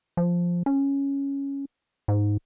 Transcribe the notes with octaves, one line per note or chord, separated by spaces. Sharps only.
F3
C#4
G#2